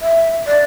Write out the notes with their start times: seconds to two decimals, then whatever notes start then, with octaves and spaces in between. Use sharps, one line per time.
0.02 E5
0.47 D5